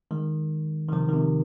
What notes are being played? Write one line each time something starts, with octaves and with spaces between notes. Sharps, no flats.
D#3 G#3
D#3
C3 F3
D#3
C3